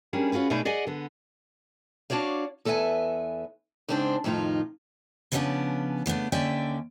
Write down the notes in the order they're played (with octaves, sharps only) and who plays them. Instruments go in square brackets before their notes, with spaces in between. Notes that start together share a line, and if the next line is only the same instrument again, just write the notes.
[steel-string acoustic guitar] G3 A#3 C#4 D4 G#4
C#4 F4 F#4 G#4 B4
B2 A3 D#4 G#4 B4 D5
G#4 D5 D#5 F#5 G#5
D3 B3
D4 F#4 C#5 D5 F5
E2 A4 B4 E5 G#5
G#2 C#3 C4 D4 B4 C5
F2 A2 D#3 D#4 F4
C#3 F3 G3 B3 C#4 D4
C#3 A3 B3 D4
D#2 D3 C#4 D5 E5 G5